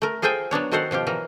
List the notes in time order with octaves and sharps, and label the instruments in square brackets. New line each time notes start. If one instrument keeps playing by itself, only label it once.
[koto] A3 A#4
F4 G#4 A4 C5 G5 G#5
F#3 B3 D4 C#5
D#3 F#4 A4 C5 F5 F#5
B2 F3 F4 G4
E3 F#3 A#4